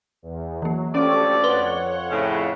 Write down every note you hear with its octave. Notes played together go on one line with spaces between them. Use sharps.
E2
E3 F#3 A#3
D2 F3 C#4 G4 A4 C#5 D5
F2 B4 C#5 F#5 C6 G7
A2 C#3